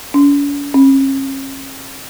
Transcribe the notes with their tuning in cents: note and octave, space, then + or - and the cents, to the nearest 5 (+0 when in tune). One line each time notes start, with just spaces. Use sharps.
C#4 +45
C#4 -40